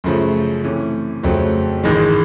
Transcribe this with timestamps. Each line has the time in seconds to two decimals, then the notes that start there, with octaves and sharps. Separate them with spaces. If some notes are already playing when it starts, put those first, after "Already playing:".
0.04 F#2 C#3 F3 A3
0.64 C3 E3 A3 C#4
1.23 F2 C#3 F#3 A3 C4
1.84 A1 G#2 D#3 G#3